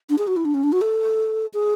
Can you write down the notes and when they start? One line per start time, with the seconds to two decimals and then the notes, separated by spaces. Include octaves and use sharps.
0.10 D4
0.18 G#4
0.27 F#4
0.36 E4
0.45 D4
0.54 C#4
0.63 D4
0.72 F#4
0.81 A4
1.53 G#4